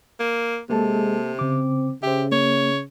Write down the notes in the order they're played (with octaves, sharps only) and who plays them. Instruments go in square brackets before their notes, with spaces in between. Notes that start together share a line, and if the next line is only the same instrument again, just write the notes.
[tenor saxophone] A#3
[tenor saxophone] C3 [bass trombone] G#3 [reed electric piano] A#3 A4 A5
[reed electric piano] C#3 D6 [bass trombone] C4
[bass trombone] C#3 [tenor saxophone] G4 [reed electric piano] C5 E5
[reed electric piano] A#3 [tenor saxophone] C#5